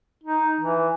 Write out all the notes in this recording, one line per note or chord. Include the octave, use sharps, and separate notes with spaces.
D#4
E3